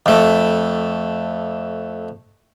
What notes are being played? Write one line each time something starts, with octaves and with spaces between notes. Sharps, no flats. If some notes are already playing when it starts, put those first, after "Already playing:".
F2 A3